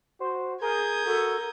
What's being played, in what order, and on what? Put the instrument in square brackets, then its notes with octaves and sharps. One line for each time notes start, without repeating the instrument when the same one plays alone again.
[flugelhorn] F#4 [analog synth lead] C5
[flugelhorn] G#4 [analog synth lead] A#4 [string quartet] D#6 G6 G#6
[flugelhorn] F#4 [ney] A4